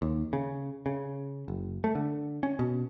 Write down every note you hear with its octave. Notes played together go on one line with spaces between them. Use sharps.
D#2
C#3
C#3
F#1
A3
D3
C#4
B2